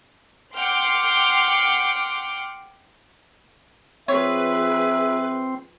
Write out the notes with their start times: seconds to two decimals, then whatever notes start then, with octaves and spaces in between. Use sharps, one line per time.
0.56 F#5 G5 C6 D6 F6
4.08 F3 C4 G#4 B4 C#5 E5